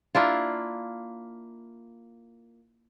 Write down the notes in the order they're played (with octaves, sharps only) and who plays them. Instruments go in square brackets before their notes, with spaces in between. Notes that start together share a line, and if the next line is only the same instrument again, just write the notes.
[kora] A#3 D4 E4 F4